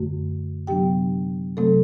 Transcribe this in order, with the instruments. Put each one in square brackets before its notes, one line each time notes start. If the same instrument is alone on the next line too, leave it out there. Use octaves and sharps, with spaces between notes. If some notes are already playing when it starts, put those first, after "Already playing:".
Already playing: [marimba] F#2 D3 A3 F#4
C3 F#3 B3 D4 G4 G5
C3 F#3 A3 C4 A4